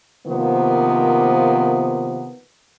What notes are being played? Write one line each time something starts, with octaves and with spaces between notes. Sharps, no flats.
C3 D#3 F3 A#3 B3